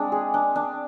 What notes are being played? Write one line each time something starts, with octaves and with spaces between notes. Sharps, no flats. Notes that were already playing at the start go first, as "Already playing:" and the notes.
Already playing: G#3 C4 D4
G#4
D4
D4